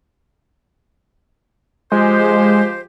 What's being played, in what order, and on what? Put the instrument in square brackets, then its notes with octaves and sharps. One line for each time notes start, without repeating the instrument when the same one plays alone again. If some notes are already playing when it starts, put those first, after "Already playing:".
[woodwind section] F3 G4 C5 [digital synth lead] G#3